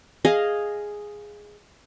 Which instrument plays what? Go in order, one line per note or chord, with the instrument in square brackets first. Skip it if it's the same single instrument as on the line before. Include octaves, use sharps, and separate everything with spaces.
[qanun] G#4 D#5 F5